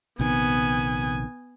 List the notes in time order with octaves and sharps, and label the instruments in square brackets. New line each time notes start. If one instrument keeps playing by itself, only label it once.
[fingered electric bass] A#1 C3 D#3 [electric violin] B3 G#5